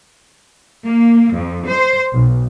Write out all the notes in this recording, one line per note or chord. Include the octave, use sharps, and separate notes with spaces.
A#3
F2
C5
B1